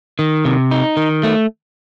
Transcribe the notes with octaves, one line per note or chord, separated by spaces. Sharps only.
D#3
C3
D#4
D#3
A3